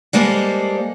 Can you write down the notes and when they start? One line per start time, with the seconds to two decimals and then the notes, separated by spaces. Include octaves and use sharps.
0.13 G3 G#3 A#3 A4 C5